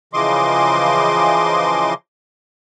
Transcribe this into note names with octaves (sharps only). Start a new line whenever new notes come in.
C#3 E3 F3 D#5 C6 D6